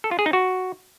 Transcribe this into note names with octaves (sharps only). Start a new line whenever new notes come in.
A4
F4
G#4
D#4
F#4